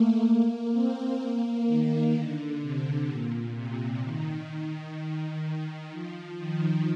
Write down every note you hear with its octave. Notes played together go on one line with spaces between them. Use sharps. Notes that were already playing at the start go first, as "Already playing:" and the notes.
Already playing: A3 A#3
A#3
C4
A#3
D#3
D3
C3
A#2
C3
D#3
D#3
F3
D#3